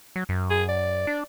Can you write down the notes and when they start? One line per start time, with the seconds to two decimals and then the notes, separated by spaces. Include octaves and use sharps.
0.16 F#3
0.29 F#2
0.50 G#4
0.68 D5
1.07 D4